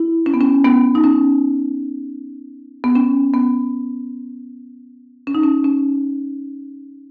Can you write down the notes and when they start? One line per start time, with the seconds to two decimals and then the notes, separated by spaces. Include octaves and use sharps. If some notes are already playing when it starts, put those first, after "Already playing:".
Already playing: E4
0.26 C#4
0.34 B3
0.41 C#4
0.65 B3
0.95 D#4
1.04 C#4
2.84 B3
2.95 C#4
3.34 B3
5.27 C#4
5.35 D#4
5.43 C#4
5.64 C#4